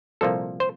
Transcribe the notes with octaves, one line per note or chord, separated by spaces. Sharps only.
C2 A#2 F3 A#3 A4
C5